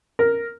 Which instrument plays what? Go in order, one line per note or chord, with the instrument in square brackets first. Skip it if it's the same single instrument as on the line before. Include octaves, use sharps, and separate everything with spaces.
[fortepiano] A#4